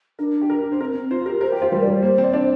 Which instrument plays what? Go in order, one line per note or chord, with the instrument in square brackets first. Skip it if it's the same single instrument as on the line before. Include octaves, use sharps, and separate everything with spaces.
[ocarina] D4 [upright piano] A#4
[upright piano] G4
A#4
[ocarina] D4 [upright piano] C5
[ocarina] C4 [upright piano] A#4
[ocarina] C4
[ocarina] F4 [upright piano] C5
[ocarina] G4 [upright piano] A#4
[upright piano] A#4 [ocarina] C5
[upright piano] G4
[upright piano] F4 [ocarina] C5
[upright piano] G3 [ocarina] A#4
[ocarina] D5
[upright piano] G3
[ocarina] C5
[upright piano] A#3
C4
[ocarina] D5
[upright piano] D4 [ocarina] C5